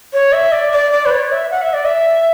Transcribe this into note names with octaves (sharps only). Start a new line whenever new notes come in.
C#5
E5
D5
D5
D5
B4
C#5
E5
F#5
E5
D5
E5